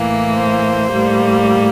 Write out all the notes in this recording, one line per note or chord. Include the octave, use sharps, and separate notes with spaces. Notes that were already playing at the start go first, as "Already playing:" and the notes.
Already playing: A2 E3 A#3
C5
A2 G3 A#3